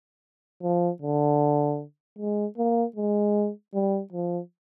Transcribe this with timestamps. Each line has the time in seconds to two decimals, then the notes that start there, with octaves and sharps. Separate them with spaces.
0.63 F3
1.02 D3
2.19 G#3
2.57 A#3
2.96 G#3
3.74 G3
4.13 F3